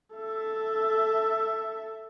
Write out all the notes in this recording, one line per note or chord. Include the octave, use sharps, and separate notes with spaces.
A4 E5